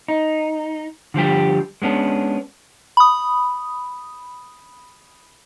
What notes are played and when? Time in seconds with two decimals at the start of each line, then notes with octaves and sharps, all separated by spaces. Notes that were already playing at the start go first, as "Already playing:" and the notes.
0.08 D#4
1.14 D3 F3 G3 G4
1.82 G#3 B3 C#4 D4
2.97 B5 D#6